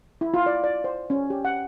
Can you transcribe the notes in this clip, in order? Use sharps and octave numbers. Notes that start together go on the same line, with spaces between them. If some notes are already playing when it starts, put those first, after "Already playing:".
E4
F4
D5
D5
C5
C#4
G4
F#5